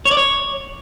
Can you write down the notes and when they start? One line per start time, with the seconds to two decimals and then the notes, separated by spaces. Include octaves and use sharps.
0.05 C#5
0.11 D5
0.17 C#5